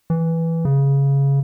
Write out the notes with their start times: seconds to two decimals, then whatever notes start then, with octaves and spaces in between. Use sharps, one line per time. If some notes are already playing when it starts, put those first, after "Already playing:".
0.10 E3
0.65 C#3